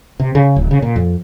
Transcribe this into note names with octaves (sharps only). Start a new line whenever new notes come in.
C3
C#3
D1
C#3
A#2
F2